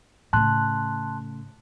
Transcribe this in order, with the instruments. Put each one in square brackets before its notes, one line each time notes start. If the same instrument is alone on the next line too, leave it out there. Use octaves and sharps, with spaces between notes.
[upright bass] A2 C#3 [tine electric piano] A5 C6 F#6